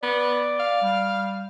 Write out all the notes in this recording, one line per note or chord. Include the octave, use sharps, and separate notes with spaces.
B3 D5
F5
G3